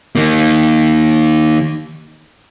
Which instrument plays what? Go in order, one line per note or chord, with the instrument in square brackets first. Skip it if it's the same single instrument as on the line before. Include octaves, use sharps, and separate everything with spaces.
[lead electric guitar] D#3 A#3